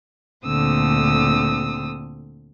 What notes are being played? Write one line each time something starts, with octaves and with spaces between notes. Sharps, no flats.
D2 A#2 D3 C4 D#6 E6